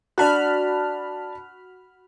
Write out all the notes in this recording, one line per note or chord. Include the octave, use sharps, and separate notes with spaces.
D4 F#4 A5 B5 F6 F#6